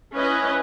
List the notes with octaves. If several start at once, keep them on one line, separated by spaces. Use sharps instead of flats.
C#4 E4 B4 D#5